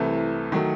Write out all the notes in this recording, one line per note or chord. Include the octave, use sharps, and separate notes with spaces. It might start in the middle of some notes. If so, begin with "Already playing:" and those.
Already playing: C2 C3 E3 A3
D#3 F#3 A3